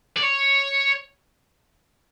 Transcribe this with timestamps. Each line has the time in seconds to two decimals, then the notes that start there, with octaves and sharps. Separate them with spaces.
0.16 D5
0.22 C#5